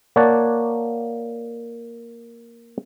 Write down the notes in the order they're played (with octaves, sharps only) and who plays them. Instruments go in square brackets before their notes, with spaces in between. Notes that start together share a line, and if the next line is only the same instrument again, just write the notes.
[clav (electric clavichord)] A#3 C#5 D5 F#5 A5